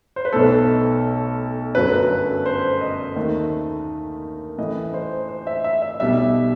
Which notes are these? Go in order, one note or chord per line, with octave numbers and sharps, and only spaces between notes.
C5
B4
B1 B2 A3 A4
G1 F#2 F#3 A3 B4
C5
D#5
D#2 D#3 A3
A1 A2 E3 A3 D#5
C5
C5
E5
E5
E5
B1 B2 G3 E5